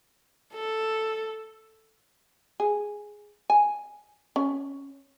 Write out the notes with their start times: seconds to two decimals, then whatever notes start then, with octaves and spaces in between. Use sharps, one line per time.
0.54 A4
2.60 G#4
3.50 G#5
4.36 C#4